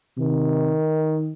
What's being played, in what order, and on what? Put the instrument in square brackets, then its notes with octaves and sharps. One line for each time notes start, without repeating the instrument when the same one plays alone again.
[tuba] C3 [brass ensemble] D#3